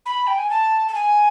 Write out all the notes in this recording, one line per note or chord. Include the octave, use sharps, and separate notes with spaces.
B5
G5
G#5
A5
A5
G#5